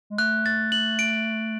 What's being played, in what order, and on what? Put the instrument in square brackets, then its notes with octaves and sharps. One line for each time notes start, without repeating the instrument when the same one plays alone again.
[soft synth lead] G#3
[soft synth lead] A3 [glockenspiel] F#6
[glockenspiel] A6
F#7
D7